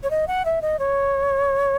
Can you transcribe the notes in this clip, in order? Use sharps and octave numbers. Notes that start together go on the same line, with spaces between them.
C#5
D#5
F#5
E5
D#5
C#5